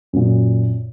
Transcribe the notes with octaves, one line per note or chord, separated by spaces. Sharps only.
F#2 A#2